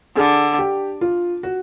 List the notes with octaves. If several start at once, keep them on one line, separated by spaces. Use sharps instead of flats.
D3 G#4
G4
F4
F#4